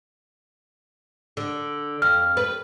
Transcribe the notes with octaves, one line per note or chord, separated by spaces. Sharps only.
D3
F2 F6
B4